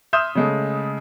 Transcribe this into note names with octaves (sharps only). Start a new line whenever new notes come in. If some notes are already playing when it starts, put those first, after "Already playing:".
E5 C6 D#6 F6 G6 E7
C#3 G#3 A3